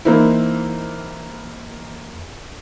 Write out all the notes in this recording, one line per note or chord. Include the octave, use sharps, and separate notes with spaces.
E3 A#3 C4 D#4 E4